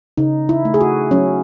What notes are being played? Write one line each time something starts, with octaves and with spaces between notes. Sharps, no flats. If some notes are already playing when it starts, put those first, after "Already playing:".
C#3 D#4
E4
A3
G#4
F#4
F#3 C#4